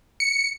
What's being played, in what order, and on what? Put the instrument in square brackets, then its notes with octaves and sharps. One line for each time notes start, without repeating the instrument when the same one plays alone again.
[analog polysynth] C#7